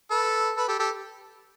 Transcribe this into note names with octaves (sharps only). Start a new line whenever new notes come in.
A4 B4
A4 B4
G4 A4
G4 A4